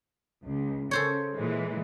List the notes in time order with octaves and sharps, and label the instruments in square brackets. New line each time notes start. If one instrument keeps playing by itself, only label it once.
[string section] C#2
[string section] C#3 [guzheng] A4 C5 C#5
[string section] A#2 E3 G#3